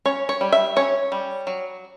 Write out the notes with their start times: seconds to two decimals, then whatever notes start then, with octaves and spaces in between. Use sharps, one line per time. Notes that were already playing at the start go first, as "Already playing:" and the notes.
0.06 C#4 C#5
0.29 C#5
0.41 G3
0.52 E5
0.76 C#4 C#5
1.12 G3
1.47 F#3